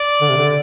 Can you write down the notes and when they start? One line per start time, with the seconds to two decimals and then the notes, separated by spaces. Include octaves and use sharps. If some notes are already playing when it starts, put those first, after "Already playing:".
Already playing: D5
0.21 D3
0.29 C3
0.37 D3